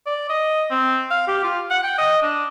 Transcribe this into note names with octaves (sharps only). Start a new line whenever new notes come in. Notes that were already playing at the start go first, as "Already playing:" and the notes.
D5
D#5
C4
F5
G4
F4
F#5
G5
D#5
D4